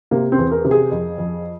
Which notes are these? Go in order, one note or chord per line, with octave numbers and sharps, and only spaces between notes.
C3 A#3
C4
E2
A#4
C3
G#4
F2
F2